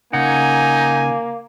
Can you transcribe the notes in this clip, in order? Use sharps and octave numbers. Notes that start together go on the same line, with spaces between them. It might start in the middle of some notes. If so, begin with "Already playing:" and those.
C#3 A#3 D#4 F#5 G#5